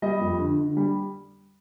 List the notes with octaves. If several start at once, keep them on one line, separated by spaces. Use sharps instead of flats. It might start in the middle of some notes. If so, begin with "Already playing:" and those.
G3 D#5
F2
D3
D3
G3